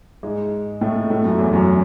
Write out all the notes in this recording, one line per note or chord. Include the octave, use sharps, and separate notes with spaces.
G#2 G#3
A2 A3
A2 A3
F#2 F#3
E2 E3
F#2 F#3